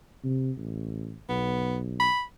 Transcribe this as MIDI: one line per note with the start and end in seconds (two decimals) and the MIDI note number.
0.24 0.51 48
0.57 1.17 33
1.29 2.08 35
1.29 1.77 59
2.00 2.22 83